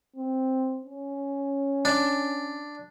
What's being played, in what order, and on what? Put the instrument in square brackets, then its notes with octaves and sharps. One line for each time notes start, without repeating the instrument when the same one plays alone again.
[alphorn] C4
C#4
[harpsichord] D4